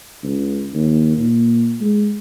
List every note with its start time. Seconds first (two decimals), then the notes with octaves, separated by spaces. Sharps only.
0.23 C#2
0.74 D#2
1.18 A#2
1.81 G#3